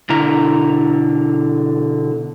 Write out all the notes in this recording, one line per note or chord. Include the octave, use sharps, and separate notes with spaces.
B2 D3 E4 A#5